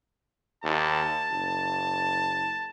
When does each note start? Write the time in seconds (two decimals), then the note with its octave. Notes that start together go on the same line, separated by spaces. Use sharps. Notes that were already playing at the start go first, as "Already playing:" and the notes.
0.64 D#2 A5
1.30 F#1